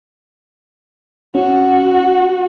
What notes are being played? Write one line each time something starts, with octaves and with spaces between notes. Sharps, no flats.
C#4 F#4